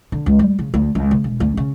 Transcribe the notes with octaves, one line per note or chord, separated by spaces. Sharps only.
D3
C#2
G3
C#3
D2
C#2
C#3
E1
D2
C#3